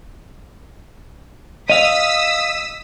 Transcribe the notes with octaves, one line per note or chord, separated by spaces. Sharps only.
D#5 F5 D#6 E6 B6